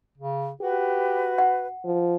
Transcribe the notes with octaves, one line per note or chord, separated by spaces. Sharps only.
C#3
F#4 G4 B4
F#5
F3